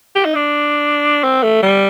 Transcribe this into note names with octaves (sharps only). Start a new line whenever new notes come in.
G4
D#4
D4
C4
A3
G3